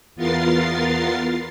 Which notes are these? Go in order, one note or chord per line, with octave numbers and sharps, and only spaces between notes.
E2 B3 F4 A#4 A6 C7